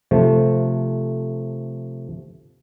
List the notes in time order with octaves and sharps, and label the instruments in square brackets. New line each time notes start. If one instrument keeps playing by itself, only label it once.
[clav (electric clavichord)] C3 F3 A3